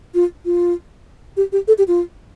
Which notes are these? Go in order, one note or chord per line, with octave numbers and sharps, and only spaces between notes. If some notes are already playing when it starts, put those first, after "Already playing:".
F4
F4
G4
G4
A4
G4
F4